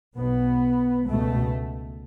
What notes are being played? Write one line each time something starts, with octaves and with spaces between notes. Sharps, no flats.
B1 B2 B3
C#2 B2 A3